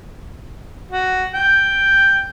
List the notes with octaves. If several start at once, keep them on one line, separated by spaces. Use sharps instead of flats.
F#4
G5